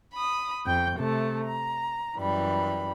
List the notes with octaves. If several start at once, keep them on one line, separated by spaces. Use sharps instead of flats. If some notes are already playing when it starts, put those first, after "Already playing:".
B5 D#6
F2 G5 G6
C3 A3 A5
A#5
F#2 E3 G3 B5